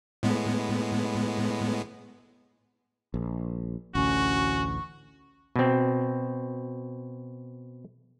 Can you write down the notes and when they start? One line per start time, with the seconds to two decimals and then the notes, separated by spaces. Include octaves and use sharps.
0.23 A2 G#3 B3
3.14 A#1
3.95 A1 D2 C#4 F#4 C#6
5.56 B2 C4